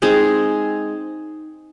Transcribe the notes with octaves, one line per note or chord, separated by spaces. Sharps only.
G#3 C4 D#4 G#4